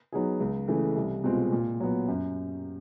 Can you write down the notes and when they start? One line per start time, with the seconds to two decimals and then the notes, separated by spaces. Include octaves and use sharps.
0.12 F#3 B3 D#4 G#4
0.40 C#2
0.68 C#3 E3 A3
0.96 C2
1.24 B2 G#3 C4 F4
1.52 A#2
1.80 F#3 B3
2.08 F#2